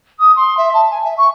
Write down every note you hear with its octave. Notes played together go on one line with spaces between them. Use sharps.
D#6
C6
E5
A5
G#5
E5
C#6